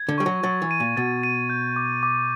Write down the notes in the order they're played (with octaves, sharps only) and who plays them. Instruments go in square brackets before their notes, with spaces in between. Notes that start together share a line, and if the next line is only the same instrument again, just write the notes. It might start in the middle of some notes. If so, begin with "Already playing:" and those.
Already playing: [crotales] G#6
[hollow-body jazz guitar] D3
[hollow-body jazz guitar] G3 [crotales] C#6
[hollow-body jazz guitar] F#3
[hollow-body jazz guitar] F#3 [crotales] A6
[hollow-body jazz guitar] E3
[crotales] D#7
[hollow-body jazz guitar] A#2
[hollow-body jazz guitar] B2 [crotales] A6
[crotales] D#7
G6
D6
D6